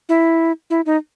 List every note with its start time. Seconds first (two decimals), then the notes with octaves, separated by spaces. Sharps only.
0.09 E4
0.70 E4
0.86 D#4